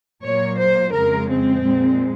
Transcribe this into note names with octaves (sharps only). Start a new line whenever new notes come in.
A#2 F#3 A#3 C#5
C5
F2 C#3 G#3 A#4
C4
A#2 G#3